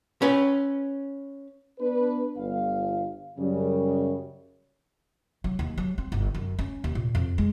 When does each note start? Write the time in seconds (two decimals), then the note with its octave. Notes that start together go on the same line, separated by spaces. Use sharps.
0.22 C#4 B4
1.80 B3 D4 B4
2.38 G1 F5
3.38 F#2 C#3 G3
5.44 F#3
5.59 D#2
5.78 F#3
5.98 C4
6.12 G1
6.35 F#2
6.59 C#4
6.84 D#2
6.95 A#2
7.15 F2
7.38 G#3